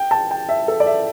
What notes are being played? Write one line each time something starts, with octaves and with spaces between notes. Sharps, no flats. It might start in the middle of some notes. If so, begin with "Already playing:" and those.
Already playing: G5
A5
G5
E5
A4
D5
E5